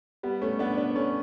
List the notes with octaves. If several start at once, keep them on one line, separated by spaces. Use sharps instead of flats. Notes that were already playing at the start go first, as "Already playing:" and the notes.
G3 B3
A3 C#4
B3 D4
B3 D4
A3 C#4